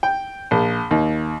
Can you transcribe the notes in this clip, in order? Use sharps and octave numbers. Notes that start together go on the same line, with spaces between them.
G5
A#1
D#2